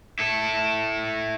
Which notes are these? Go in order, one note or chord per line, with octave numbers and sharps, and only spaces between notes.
E4 A4